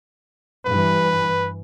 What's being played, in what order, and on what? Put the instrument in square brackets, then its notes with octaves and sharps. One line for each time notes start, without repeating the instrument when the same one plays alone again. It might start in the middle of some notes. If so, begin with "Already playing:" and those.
[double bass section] G2 E3 [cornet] B4